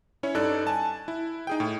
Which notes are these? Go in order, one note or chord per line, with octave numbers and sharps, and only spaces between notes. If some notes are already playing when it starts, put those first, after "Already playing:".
C#4 E4 C#5
G2 D#4 A4 D5 F#6
G#5 A5
E4
D#4 G#4 G5
A2